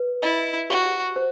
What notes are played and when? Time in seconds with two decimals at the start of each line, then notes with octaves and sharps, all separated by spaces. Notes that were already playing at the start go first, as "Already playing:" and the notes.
Already playing: B4
0.23 E4 D#5
0.70 F#4 G4
1.16 C5